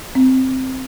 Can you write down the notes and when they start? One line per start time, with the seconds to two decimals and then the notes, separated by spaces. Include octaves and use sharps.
0.15 C4